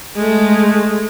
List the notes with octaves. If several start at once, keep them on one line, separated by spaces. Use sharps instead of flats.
G#3 A3